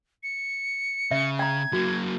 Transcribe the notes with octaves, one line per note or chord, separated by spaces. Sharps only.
C#7
C#3 E5
G5 A#5 G#6
F#3 A#3 F#4